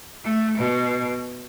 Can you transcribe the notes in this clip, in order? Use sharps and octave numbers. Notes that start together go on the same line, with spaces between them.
A3
B2